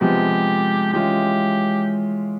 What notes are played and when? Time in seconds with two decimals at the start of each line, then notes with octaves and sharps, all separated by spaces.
0.01 C3 F3 G#3 B3 G4
0.93 E3 G#3 C#4 F4 G4